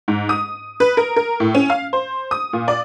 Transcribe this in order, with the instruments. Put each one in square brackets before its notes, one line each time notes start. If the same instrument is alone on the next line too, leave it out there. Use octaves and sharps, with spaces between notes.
[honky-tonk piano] G#2
D#6
B4
A#4
A#4
A2
C#4
F5
C5
D#6
A#2
D5